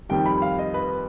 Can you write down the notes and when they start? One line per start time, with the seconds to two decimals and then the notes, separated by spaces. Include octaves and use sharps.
0.09 F2 D#3 G3 G5
0.26 B5
0.42 F5
0.59 D#5
0.74 B4